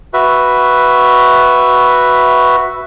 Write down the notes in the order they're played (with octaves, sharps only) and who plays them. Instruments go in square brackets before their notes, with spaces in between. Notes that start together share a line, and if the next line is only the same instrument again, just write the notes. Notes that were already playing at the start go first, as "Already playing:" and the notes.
[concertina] F#4 B4 E5